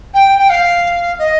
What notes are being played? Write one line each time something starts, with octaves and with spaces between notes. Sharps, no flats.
G5
G5
F5
D#5